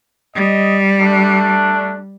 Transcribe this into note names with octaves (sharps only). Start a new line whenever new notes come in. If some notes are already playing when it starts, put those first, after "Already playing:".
G3 D#5
A3 D4